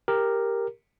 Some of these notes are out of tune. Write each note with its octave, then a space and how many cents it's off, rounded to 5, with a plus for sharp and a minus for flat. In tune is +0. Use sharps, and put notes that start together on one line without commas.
G4 +10 A#4 +0